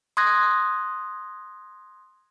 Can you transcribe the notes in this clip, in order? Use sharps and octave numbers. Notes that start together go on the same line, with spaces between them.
C6 D#6 F#6 G#6 A#6